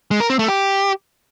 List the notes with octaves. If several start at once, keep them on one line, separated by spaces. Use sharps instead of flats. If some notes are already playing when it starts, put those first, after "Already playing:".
G#3
A#4
C4
A3
G4